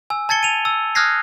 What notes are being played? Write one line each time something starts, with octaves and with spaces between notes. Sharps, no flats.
G#5 E6
A5 G#6 A6 C#7 G7
D#7 F7
E6
D#6 F6 F#6 G#6 A#6 C7